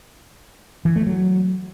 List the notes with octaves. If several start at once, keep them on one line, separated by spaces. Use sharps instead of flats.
E3
A3
F#3